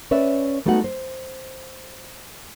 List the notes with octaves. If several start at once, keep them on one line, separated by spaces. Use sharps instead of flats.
C#4 B4 C#5 D5 E5
G3 A3 B3 D#4 F#4 F#5
C5